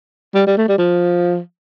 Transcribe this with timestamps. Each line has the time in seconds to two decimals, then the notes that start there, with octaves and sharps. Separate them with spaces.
0.35 G3
0.47 G3
0.58 A3
0.69 G3
0.78 F3